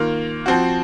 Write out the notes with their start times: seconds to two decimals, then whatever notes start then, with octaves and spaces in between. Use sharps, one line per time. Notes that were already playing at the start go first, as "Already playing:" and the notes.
Already playing: D#3 A#3 F4
0.46 F3 C4 F#4